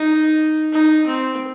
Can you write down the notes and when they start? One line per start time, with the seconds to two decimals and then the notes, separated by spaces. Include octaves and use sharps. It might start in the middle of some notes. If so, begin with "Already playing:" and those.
Already playing: D#4
0.72 D#4
1.06 C4